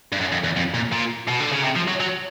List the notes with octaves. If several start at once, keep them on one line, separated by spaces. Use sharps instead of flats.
G2
F#2
F2
E2
F2
A#2
A#2
B2
D3
C#3
C3
F3
F#3
F#3